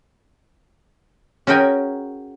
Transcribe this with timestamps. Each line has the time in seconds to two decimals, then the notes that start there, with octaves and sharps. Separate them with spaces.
1.47 C#4 F#4 G#4 A#4 G5 G#5